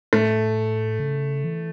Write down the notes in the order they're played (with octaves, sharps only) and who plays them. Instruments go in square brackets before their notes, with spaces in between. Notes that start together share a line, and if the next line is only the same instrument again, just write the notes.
[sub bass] A2 [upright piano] A3
[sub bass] C#3
E3